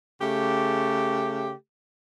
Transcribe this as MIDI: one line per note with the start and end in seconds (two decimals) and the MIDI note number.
0.20 1.51 49
0.20 1.51 57
0.20 1.51 67